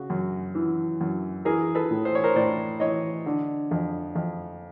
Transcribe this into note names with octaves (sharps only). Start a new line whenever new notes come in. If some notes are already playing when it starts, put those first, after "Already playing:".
Already playing: C#3 F#4
F#2
E3
F#2
E3 G#4 A#4
A4 B4
A2
C5
C#5
A#4 C5
A2 C5 D5
E3 C#5 D#5
D3
F2
F2